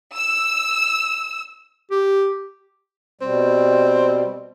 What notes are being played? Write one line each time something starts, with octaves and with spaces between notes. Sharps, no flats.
E6
G4
B2 G3 C4